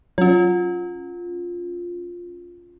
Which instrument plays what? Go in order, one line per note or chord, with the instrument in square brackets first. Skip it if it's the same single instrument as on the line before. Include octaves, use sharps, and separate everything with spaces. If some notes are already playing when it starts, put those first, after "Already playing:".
[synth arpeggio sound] F#3 [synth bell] C#4 F4